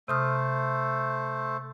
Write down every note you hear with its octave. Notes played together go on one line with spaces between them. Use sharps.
C3 A3 C5 D#6 F6